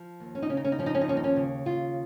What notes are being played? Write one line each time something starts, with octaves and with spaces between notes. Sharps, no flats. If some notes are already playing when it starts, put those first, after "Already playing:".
Already playing: F3
D#2
C#4
D#4
C#3 C#4
D#4
C#4
D#4
F3 C#4
D#4
C#4
D#4
D#2 C#4
D#4
C#4
C#3
D#2 F4